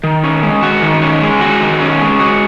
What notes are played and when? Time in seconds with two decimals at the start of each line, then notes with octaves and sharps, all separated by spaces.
0.04 D#3
0.24 C#4
0.43 G#3
0.63 F#4
0.82 D#3
1.02 C#4
1.22 G#3
1.41 F#4
1.61 D#3
1.80 C#4
2.00 G#3
2.20 F#4